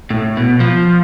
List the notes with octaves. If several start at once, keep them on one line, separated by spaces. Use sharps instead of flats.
A2
B2
F3